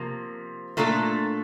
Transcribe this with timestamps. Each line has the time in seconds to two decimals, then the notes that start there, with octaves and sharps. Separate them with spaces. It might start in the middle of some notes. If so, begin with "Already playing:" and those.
Already playing: C3 F3 A#3
0.77 A#2 A3 D4 F4 A4